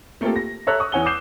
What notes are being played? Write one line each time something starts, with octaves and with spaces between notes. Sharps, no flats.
A3 A#3 C4 F4 G4 A4
A#6
A4 C#5 E5 A#5 E6 F#6
C#6 D#6
E2 C#5 F#5 G#5 G7
D6 G6 C7 E7